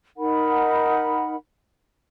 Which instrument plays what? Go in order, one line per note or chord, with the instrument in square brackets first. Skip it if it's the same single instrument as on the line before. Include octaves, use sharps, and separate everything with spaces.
[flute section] D#4 A#4 F#5 B5